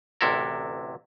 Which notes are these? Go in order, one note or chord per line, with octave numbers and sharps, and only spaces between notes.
A1 D2 C3 E4 A4 A#4